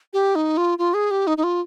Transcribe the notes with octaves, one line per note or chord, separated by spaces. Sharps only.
G4
D#4
F4
F4
G#4
G4
D#4
D#4
F4